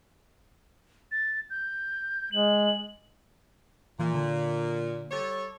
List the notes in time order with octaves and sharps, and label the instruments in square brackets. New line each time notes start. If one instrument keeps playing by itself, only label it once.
[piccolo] A6
G6
[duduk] G#3 [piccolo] F#7
[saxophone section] A#2 [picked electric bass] E3
[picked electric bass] D3
[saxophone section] G3 A4 C#5